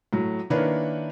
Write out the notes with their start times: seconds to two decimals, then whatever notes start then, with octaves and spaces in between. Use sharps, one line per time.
0.13 A2 F#3
0.50 D#3 A#3 D4 E4 B4 C#5